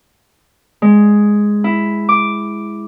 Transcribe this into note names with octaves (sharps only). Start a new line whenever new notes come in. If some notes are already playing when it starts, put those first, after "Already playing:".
G#3
E4
D6